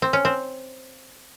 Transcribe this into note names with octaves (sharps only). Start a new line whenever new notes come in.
C4
C#4
C4